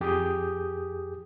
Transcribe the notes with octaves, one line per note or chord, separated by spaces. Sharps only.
F2 G4 G#4 D6 D#6 G6